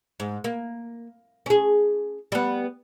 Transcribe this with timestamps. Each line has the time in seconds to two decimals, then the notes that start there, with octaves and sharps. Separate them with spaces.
0.20 G#2
0.44 A#3
1.46 C#4 G#4
2.32 G3 B3